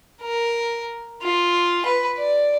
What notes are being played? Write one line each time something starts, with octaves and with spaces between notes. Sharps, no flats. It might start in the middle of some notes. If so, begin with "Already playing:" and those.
A#4
F4
B4
D5